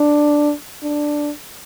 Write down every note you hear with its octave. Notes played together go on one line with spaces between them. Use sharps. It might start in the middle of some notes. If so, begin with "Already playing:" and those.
Already playing: D4
D4